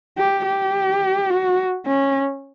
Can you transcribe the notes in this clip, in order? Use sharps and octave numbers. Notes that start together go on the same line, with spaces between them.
G4
G4
F#4
C#4